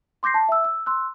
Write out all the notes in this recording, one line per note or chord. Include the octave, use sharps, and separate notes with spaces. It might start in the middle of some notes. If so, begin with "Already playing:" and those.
C6 D6 G6 A#6 C7
A5
E5 E6
E6
C6 E6 F#6